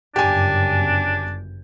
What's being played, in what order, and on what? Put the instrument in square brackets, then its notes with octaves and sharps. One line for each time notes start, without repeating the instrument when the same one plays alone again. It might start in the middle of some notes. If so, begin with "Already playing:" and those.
[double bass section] G1 F#2 C#3 [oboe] D4 [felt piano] G4 G#5